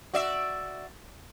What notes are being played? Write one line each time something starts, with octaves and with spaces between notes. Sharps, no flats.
F#4 D5 E5